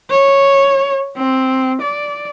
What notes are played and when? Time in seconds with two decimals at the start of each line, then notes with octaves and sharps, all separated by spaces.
0.10 C#5
1.17 C4
1.82 D5